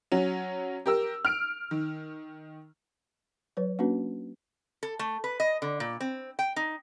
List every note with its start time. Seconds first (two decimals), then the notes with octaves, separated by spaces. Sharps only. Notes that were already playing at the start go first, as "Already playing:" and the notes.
0.12 F#3 C#4
0.86 G4 A#4 E6
1.25 F6 D7
1.71 D#3
3.57 F#3 B4 C#5
3.79 A#3 C#4 D4 F#4 B4
4.83 A4
4.99 A3
5.24 B4
5.40 D#5
5.62 D3
5.80 A#2
6.01 C4
6.39 G5
6.56 D#4